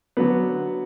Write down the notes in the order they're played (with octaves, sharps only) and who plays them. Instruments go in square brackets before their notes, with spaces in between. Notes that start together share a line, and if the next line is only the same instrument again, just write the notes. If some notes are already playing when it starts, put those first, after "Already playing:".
[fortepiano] D3 F#3 B3